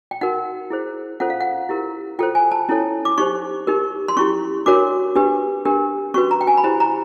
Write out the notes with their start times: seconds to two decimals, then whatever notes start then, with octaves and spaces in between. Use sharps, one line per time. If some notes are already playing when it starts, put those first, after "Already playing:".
0.11 G5
0.21 D#4 F#4 A#4 F#5
0.70 E4 G#4 C5
1.20 C#4 F4 A4 C5 F#5
1.30 F5
1.41 F#5
1.69 E4 G4 A#4
2.19 F4 A4 C5 G5
2.35 G#5
2.52 A5
2.69 C#4 E4 A4 C#5
3.05 D6
3.18 D#4 G4 C5 C#6
3.67 D#4 G4 A#4
4.08 C6
4.17 C#4 E4 G4 C#6
4.66 D4 F#4 A#4 C#5 D6
5.15 D4 G4 B4
5.65 D4 G4 A#4
6.14 C#4 F#4 B4 C#6
6.31 A#5
6.41 G5
6.47 G#5
6.57 B5
6.64 E4 G4 C5 A#5
6.80 A#5